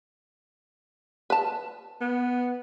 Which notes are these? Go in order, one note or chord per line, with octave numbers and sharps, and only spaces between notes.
B4 A5
B3